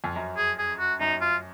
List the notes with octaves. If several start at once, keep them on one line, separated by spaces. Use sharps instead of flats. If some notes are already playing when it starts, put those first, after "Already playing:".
F2
F#2
G#4
G#4
F#4
F#2 D#4
F4